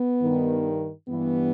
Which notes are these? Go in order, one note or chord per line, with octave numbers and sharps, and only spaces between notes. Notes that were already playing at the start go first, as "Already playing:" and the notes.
Already playing: B3
G2 D#3
G2 E3 B3